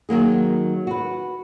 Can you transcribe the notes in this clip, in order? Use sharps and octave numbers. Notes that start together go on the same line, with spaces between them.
D#3 F#3 A#3 G#4
F#4 B4